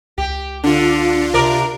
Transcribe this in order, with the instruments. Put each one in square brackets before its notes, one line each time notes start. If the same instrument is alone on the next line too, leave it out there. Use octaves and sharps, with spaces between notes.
[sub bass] C#2 [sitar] G4
[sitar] D3 [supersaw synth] D4 F4
[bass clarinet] C3 [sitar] A#4 D5